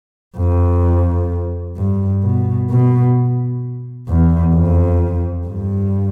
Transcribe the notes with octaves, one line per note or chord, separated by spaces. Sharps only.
F2
G2
B2
B2
E2
F2
G2